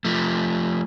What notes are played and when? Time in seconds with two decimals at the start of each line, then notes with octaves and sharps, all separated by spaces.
0.05 F3 A3